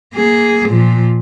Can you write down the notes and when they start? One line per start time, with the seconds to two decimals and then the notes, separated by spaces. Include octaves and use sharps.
0.15 A#3 G#4
0.69 A#2 F3